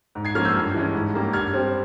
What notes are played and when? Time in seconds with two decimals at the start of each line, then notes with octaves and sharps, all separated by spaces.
0.15 G#2
0.25 G#6 C7
0.35 F3 A#3 C#4 F6 G#6
0.45 E6 G6
0.55 G2
0.74 E3 G#3 C#4
0.94 G#2
1.14 G3 A#3 C#4
1.33 G2 F6 G#6
1.54 G3 C4